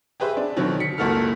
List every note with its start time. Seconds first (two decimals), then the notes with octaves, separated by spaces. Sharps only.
0.20 G4 G#4 B4 C5 E5
0.37 D4
0.56 B2 D3 D#3 F#3 C4
0.80 B6 C#7
0.98 F#1 C#2 A#3 F#4 A4 F6